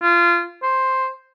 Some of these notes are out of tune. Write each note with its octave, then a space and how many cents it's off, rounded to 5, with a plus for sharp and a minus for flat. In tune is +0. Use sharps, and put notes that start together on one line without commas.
F4 -25
C5 +5